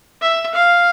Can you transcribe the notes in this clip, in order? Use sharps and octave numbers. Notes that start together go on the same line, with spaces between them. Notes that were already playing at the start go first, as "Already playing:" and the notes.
E5
F5